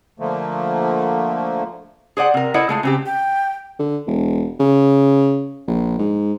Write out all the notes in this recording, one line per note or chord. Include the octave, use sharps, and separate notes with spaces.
D3 F3 A3 A#3
G#4 C5 D5 F#5
C3 A#4
E4 A4 C5 D5 D#5 F#5
G#3 A3 F4
C#3 C4 G4
G5
D3
E1
C#3
A#1
G#2